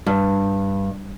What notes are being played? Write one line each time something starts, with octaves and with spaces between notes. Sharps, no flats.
G2